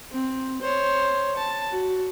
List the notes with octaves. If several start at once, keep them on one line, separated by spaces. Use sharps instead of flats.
C4
C5 C#5
A5
F#4